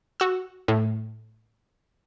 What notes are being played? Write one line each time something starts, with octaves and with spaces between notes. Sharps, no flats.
F#4 E6
A2